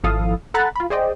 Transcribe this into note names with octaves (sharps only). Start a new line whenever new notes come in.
G#1 F3 E4 A4 F5 D#6
A4 F#5 A#5 B5 F#6 A6
F4 B5
G#4 C5 D5 D#5 G5